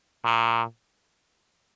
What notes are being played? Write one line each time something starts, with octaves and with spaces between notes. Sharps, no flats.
A#2